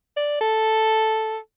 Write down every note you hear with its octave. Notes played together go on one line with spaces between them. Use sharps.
D5
A4